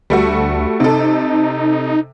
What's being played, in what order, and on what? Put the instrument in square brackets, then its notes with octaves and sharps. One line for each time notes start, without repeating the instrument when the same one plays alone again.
[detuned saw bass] D2 [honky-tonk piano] G3 A3 F#4
[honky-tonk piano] C3 A4 [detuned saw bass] D#4